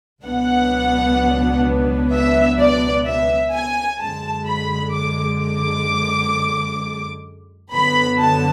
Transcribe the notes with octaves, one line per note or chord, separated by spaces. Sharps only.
C#2 B2 F#3 B3 D4 F#5
E5
D5
E5
G#5
F#2 D3 G#3 A5
B5
D6
D6
F#2 D3 F#3 B3 B5
A5